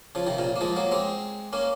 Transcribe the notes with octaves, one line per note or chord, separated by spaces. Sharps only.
C#3 F3
C3 D#3
A#2 C#3
A#3
F3 G#3
F#3 A#3
G#3 C4
A#3 C#4